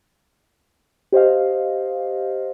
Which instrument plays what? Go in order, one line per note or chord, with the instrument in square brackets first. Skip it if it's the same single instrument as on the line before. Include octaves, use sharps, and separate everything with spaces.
[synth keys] G4 C5 D#5 F5